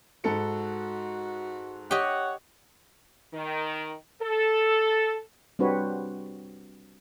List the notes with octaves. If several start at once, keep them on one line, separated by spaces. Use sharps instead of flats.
G#2 F#4 A4 C#7
G4 C#5 D#5 F#5
D#3
A4
G3 C4 D4 F#4 B4 C#5